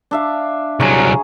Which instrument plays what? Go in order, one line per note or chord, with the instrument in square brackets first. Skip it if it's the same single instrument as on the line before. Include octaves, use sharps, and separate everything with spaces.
[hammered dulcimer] D4 E5 F5
[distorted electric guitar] C2 F#3 [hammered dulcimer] G#4 A#5 C#6